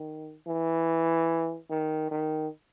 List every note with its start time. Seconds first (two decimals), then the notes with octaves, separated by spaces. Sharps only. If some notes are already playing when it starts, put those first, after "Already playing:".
Already playing: D#3
0.47 E3
1.70 D#3
2.11 D#3